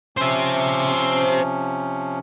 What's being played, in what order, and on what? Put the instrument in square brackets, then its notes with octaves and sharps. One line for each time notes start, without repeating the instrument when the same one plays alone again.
[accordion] C3 F3 C#4 [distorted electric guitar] C5 E5